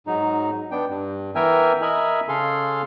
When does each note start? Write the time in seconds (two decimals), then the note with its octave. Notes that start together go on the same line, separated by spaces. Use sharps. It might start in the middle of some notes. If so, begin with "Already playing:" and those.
0.07 G#2 F#3 D#4
0.71 B3 D4 G5
0.89 G2
1.35 E3 B3 A#4 E5 G5 G#5
1.82 A#4 D#5 E5 G#5 B5
2.29 C#3 G#4 A4 F5 C6